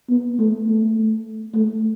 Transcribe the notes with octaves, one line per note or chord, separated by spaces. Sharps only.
B3
A3
A3
A3